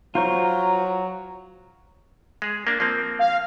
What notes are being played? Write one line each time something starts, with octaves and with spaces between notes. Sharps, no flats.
F#3 F4 C5 A#5 C#6
G#3 G#4
A#3 D4
F3 A#3 C4
F5